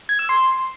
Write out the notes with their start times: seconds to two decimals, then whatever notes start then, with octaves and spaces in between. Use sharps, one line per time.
0.09 G#6
0.19 E6
0.29 C6